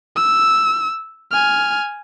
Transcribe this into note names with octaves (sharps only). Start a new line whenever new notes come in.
E6
G#5 F6